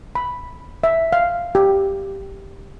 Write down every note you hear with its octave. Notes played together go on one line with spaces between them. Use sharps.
B5
E5
F5
G4